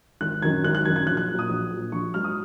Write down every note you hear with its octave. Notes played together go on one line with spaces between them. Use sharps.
G#1 F#6
F#2 D#3 F#3 G#6
G#1 F#6
F#6
F#2 D#3 F#3 G#6
G#6
A#1 F#6
F#6
A#2 F#3
D#6
A#1
A#2 F#3
A#1 C#6
G#2 F#3 F6
D#6